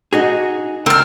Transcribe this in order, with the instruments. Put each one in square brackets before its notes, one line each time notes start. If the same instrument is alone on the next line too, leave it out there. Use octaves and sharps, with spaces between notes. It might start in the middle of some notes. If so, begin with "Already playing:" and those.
[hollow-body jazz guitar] D#4 F#4 G#4
[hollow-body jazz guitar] C#2 A#4 [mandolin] C4 F6